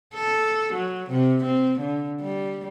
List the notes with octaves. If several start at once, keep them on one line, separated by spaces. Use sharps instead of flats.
A4
F#3
C3
C4
D3
G3